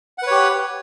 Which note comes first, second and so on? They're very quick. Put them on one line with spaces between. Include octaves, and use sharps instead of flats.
F#5 B4 C#5 G4